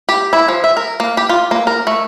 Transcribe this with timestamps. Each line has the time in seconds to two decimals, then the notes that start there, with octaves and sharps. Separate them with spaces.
0.09 G4
0.33 E4
0.48 F3
0.64 E5
0.77 A#4
1.00 A#3
1.17 G4
1.29 F4
1.51 A#3
1.67 A#4
1.87 A3